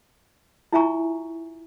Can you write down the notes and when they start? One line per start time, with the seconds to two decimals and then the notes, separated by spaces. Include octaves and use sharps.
0.72 E4 F4 E5 G#5 A#5 C#6